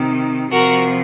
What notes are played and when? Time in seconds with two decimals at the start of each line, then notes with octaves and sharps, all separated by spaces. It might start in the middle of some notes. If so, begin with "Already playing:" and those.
Already playing: C3 D#3
0.52 C3 F3 F#4 A#4